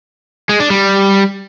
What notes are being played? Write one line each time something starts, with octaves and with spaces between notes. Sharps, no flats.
G#3
D4
G3